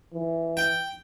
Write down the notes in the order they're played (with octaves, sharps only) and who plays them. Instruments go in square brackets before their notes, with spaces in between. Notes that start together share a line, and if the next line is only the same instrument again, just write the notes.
[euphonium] E3
[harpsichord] G5